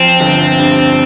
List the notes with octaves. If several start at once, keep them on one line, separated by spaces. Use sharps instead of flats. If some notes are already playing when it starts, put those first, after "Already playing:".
Already playing: F3 C4
G1
G2